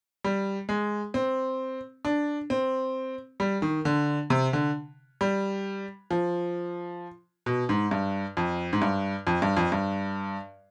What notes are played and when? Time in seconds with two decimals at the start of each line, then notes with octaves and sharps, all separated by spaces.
0.24 G3
0.69 G#3
1.14 C4
2.05 D4
2.50 C4
3.40 G3
3.62 D#3
3.85 D3
4.30 C3
4.53 D3
5.21 G3
6.11 F3
7.46 B2
7.69 G#2
7.91 G2
8.37 F2
8.73 G#2
8.82 G2
9.27 F2
9.42 G2
9.57 F2
9.72 G2